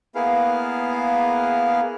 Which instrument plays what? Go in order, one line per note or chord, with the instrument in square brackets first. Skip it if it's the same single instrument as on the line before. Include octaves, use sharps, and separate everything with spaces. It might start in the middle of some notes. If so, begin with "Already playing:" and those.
[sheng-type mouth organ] A#3 B3 E4 G#4 F5